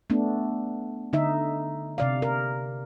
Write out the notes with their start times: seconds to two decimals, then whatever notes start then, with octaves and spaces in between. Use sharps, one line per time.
0.10 A3 B3 D4
1.13 D3 D#4 E5
1.98 C3 D5 F5
2.22 A#4